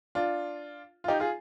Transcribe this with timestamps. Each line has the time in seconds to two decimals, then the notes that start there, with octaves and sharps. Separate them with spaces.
0.15 D4 F4
1.04 F4
1.08 D#4 G4
1.20 F4 G#4